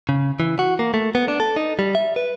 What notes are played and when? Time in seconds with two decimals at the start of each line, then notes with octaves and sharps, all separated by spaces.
0.09 C#3
0.40 E3
0.59 F#4
0.79 A#3
0.94 A3
1.15 B3
1.28 D4
1.40 A4
1.56 D#4
1.79 G3
1.95 E5
2.16 B4